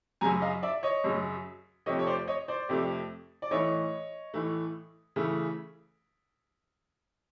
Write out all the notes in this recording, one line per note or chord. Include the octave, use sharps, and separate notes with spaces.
F#2 C#3 F#3 G#5 A#5
D#5 F5
D5 E5
C#5 D#5
F#2 C#3 F#3
F2 C3 F3 A3 C#5 D#5
C#5
C5 D5
C#5 D#5
C5 D5
F2 C3 F3 A3
D5
A2 E3 A3 C#5 D#5
A2 E3 A3
C#3 E3 A3